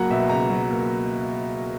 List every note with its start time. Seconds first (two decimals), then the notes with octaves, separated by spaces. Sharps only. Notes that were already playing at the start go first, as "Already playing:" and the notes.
Already playing: C#2 F#3 A#3 F#5 A#5
0.10 B2 E5
0.29 C#2 A#5
0.50 F#3
0.70 A#3